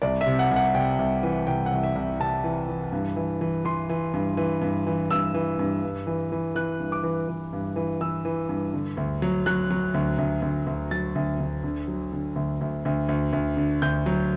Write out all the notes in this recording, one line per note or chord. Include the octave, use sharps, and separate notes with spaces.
C2 D5
E5
C3
F#5
C2
F#5
C3 G5
C2
E3
C2 G5
F#5
C2
E5
C2
C3 A5
E3
E3
G2
E3
E3
E3 C6
E3
G2
E3
G2
E3
G2 E6
E3
G2
G2
E3
E3
E3 F#6
G2
D6
E3
E3
G2
E3
E3 E6
E3
G2
D3
D2
F#3
F#3 F#6
F#3
D2
D2
D2
D2
F#3 A6
D2
D2
D3
F#3
D3
D2
D2
D2
D2
D2
D3
D2 G6
F#3